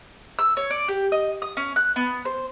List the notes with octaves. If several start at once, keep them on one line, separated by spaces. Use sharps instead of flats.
E6
C#5
D5
G4
D#5
D#6
C#4
F#6
B3
C5